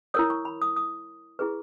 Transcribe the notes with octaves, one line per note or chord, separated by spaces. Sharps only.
E4 A#4 C#5 D#6
C#6
B5
D#6
D#6
E4 G#4 B4 C#6